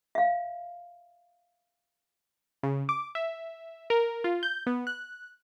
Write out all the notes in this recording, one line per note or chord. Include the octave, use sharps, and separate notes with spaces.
E5 F5
C#3
D6
E5
A#4
F4
G6
B3
F#6